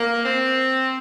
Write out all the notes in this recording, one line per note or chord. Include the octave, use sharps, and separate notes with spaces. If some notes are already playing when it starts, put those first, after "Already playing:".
Already playing: A#3
C4